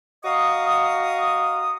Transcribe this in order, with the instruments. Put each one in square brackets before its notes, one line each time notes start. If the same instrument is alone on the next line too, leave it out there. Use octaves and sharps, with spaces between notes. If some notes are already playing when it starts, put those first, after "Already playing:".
[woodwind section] F#4 D#5 F5 A#5 C#6 D#6